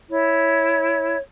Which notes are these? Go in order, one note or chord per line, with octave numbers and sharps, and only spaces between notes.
E4 C#5